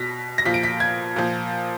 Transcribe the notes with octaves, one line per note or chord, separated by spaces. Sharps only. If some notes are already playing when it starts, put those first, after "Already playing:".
Already playing: B2 A#6 B6
A#6
A#2 F3 B6
D7
B6
G#6
A#2 F3